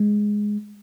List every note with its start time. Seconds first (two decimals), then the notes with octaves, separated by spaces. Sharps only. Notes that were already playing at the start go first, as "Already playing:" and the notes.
Already playing: G#3